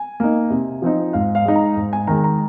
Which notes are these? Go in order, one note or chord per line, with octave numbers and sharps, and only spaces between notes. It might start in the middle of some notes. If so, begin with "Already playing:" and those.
Already playing: G#5
A#3 D#4
C3
F3 C4 D#4
G#2 F5
F5
G#3 D#4
A#5
G#2
G#5
D#3 G#3 A#5
A#5